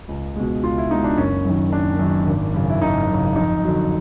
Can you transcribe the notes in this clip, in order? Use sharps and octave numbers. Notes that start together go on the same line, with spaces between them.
C#2
B2 G#3
C#2 F4
E4
B2 G#3 D#4
D4
F#1 C#4
F#2 D#3
F#1 D4
F#2 D#3
G#1
F#2 C#3
E4
G#1 D#4
F#2 C#3
F2 D#4
D3 F#3